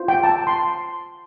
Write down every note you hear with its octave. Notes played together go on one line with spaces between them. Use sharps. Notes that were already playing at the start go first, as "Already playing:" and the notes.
Already playing: F4 C5
G5
A5
C6